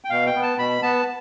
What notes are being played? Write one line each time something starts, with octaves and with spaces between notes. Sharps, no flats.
G5
B2 F5
G5
B3
A5
B2 B5
B3 A5